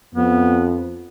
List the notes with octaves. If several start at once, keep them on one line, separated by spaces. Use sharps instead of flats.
F2 B3